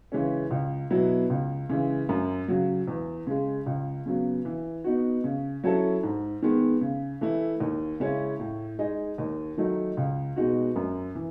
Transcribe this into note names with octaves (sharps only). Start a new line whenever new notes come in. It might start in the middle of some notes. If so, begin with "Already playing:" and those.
C#3 E3 G#3 C#4
C#2
B2 F#3 B3 E4
C#2
C#3 E3 G#3
F#2
C#3 F#3
E2
C#3 G#3
C#2
C#3 F#3 B3
E3
B3 D#4 F#4
C#3
F#3 C#4 E4 A4
G#2
D#3 G#3 B3
C#3
E3 A3 E4
D#2
C#3 G#3 C#4 E4
A2
G#3 D#4 G#4 D#5
D#2
D#3 F#3 A3 D#4
C#2
B2 G#3 D#4 F#4
F#2
E3